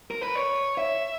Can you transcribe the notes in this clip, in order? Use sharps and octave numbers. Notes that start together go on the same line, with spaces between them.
A#4
B4
C#5
E5